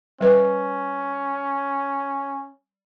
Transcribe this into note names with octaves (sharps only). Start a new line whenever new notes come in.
G3 C#4 B4 D#5